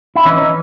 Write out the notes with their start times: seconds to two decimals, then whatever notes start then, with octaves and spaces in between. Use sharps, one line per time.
0.16 E4
0.25 E3 C#4 D#4
0.37 C#4 D#4
0.42 E3